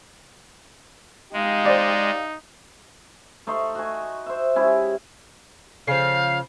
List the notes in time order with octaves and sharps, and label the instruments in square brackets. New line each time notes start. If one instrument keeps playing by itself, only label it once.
[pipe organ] G#3 [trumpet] D#4 [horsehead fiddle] G4 F5
[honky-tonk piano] C5 D5
[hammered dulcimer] A3 D#4 C6 C#6
F#4 G#5
C5 E5
G#3 C#4 E4 G4
[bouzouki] C#3 F3 [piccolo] F5 [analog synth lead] C7